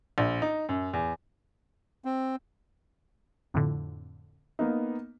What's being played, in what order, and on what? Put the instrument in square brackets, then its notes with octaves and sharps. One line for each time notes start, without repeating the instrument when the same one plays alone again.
[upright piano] A#1
D#4
F#2
E2
[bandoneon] C4
[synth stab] F2 A2 D3
[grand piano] A#3 B3 D#4